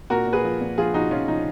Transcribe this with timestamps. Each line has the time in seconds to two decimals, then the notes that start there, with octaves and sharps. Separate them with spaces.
0.10 A#2 F#4 A#4
0.27 A#2
0.33 G#4 B4
0.44 F3
0.61 A#2
0.78 F3 F4 G#4
0.94 F3 D#4 F#4
1.11 F3 C#4 F4
1.28 F3 D#4